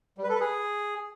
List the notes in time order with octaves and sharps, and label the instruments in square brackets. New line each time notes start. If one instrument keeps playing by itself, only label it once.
[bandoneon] G3
B4
A4
B4
G#4